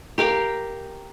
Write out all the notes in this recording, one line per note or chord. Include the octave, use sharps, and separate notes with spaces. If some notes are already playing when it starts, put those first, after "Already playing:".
G4 A#4 F5 G5